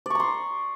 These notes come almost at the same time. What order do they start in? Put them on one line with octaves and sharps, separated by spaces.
D5 C#6 A#5 C6